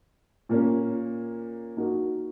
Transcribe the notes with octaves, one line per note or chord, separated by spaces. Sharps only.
A#2 A#3 C#4
A#3 D#4 F#4 A#4